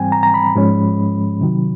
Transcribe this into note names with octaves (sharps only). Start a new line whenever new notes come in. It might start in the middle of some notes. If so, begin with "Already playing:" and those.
Already playing: G#2 E3 G3 C4 G5 G#5
A#5
A#5
B5
G#2 F3 G#3 C#4
C3 D#3 F#3